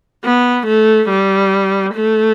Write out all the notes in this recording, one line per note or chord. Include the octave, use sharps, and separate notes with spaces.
B3
A3
G3
A3